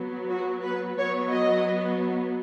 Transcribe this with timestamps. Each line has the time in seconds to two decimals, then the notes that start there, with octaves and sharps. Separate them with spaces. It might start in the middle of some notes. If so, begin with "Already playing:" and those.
Already playing: F#3 B3
0.31 F#4
0.63 B4
0.98 F#3 B3 C#5
1.31 D#5